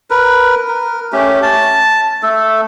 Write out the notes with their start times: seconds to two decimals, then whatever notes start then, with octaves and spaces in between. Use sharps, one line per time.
0.10 A#4 B4
0.68 A#4
1.12 A3 C#4 G4
1.43 A5
2.23 A3 A4